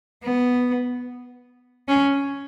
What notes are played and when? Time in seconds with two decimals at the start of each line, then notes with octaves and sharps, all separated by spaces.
0.23 B3
1.88 C#4